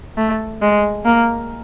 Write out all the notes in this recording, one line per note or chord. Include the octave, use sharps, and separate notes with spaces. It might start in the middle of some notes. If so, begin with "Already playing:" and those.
A3
G#3
A#3